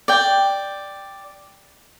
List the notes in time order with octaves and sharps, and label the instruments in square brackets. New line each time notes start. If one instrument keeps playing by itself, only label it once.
[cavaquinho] D5 G5